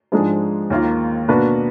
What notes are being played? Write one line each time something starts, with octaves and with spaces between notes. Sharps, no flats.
G#2 F3 G#3 D4 G#4
D#2 D#3 A#3 F4
B2 A#3 D4 F#4 B4